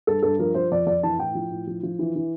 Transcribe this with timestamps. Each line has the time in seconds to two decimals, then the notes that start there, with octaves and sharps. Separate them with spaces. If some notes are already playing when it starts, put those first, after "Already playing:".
0.07 G2 A4
0.23 G2 A4
0.39 F3 A#4
0.55 F3 C5
0.71 F2 D5
0.87 F2 D5
1.03 E3 A5
1.19 A2 G5
1.35 F3
1.51 A2
1.67 F3
1.83 F3
1.99 E3
2.16 E3